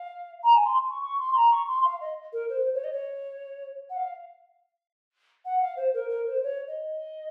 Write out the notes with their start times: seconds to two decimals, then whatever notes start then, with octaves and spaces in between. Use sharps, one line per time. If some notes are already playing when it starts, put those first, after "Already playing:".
Already playing: F5
0.43 A#5
0.53 G#5
0.65 C6
0.90 C#6
1.02 C#6
1.19 C6
1.35 A#5
1.51 C#6
1.68 C6
1.85 F5
2.01 D#5
2.32 A#4
2.49 C5
2.74 C#5
2.84 D#5
2.92 C#5
3.90 F#5
3.96 F5
5.45 F#5
5.61 F5
5.76 C5
5.94 A#4
6.09 A#4
6.26 C5
6.43 C#5
6.67 D#5